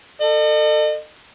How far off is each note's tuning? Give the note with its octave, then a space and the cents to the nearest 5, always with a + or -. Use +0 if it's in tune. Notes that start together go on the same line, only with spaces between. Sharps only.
A4 +25 D#5 -40